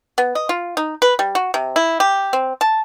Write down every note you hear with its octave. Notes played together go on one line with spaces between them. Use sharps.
B3
D#5
F4
D#4
B4
G3
F#4
C3
E4
G4
C4
A5